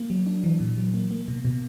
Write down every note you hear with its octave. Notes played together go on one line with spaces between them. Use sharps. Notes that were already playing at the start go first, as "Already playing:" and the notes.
Already playing: A#3
F#3
D4
E3
A#2
F#3
A#3
A#3
B2
B2